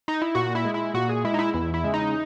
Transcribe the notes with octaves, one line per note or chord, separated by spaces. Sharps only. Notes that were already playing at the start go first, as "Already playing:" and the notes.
D#4
E4
A#2 F#4
E4
G#3
E4
A#2 F#4
G#4
G#3 E4
D#4
E4
E2 E4
E4
C#3 G#3
D#4